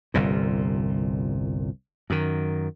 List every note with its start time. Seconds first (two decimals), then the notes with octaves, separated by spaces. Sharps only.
0.14 G1 C2 A#2
2.10 F#2 D#3